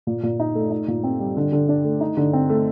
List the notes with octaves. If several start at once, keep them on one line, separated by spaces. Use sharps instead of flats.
A#2
A#2
D#4
A3
D#4
A#2
C4
G3
D3
D3
D4
A3
D#4
D3
C4
A3